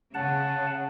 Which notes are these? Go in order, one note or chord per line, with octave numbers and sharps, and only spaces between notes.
C#3 F#5 A5